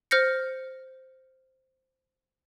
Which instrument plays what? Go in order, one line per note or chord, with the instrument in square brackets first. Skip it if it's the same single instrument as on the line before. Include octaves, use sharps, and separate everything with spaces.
[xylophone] C5 F6 G6 A#6 C#7